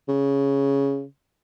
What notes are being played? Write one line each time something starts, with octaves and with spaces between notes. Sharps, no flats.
C#3